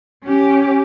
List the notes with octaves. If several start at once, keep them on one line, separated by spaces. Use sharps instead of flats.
C#4 G4